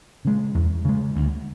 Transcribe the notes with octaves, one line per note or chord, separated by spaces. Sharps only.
C#3 G#3
E2
C#3 G#3
D2